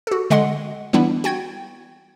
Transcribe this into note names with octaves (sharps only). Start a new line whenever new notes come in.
F#4 A4
D3 G#3 D#5 F#5 C6
E3 G3 B3 D4 E4
F#4 G5 G#6